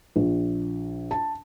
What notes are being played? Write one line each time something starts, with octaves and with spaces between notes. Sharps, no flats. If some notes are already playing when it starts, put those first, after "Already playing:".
A#1
A5